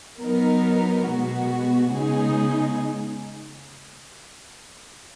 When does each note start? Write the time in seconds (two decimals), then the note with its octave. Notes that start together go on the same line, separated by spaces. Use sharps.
0.20 F#3 B3 D#4 A#4
1.07 B2 G#3 B3 F#4
1.94 C#3 G#3 B3 D#4 G#4